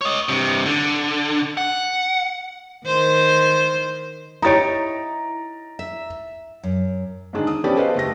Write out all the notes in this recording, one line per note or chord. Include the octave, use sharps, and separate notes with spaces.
C#5 D#5
G2 C3
D3
F#5
D#3 C5
D#4 E4 G4 C#5 A#5 A6 D7
E5
F#2
G#2 D3 D#3 D4 G#4
D#6
F3 B3 C#4 G4 A4 D5
G#4 A4 B4 C5 D#5 F5
F#1 A3 G4 A#6